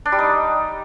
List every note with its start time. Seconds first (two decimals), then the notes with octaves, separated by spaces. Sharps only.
0.06 D4
0.12 G3
0.19 D#4